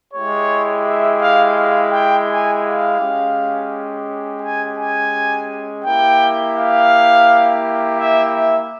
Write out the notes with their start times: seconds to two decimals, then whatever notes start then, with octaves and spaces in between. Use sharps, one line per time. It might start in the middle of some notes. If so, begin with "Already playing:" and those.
0.13 G#3 E4 G4 C#5
0.85 E5
1.21 F5
1.56 F5
1.92 G5
2.28 G#5
2.63 F5
2.99 G#3 C#4 G4
4.42 G#5
4.78 G#5
5.84 A#3 E4 G4 G5
6.56 F5
7.99 E5
8.34 E5